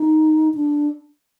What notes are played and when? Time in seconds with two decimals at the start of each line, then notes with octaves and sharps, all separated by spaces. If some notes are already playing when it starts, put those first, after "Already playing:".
Already playing: D#4
0.55 D4